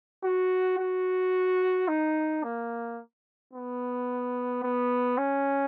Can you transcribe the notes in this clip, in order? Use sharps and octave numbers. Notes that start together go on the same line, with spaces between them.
F#4
F#4
D#4
A#3
B3
B3
C#4